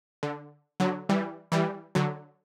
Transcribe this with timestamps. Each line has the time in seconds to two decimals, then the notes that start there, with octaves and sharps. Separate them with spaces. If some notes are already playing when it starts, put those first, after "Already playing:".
0.23 D3
0.80 D3 F#3
1.09 E3 G3
1.52 E3 G3
1.95 D3 F#3